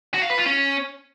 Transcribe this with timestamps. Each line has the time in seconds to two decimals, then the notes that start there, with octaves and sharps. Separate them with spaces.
0.14 F#4
0.22 F5
0.30 B4
0.38 F4
0.46 C#4